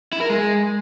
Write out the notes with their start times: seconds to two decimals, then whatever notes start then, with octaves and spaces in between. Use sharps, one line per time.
0.13 E4
0.21 A#4
0.30 G#3